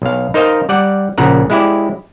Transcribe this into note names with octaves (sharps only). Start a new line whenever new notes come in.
B1 F5
D#4 A#4 C5 D#5 F5
G3 D5 F#5
A#1 A#2 C#3 F#5 A#5
G#3 E4 G4 D5